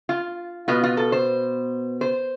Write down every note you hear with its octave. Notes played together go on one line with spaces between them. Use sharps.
F4
B2 B3 F4
F4
A4
C5
C5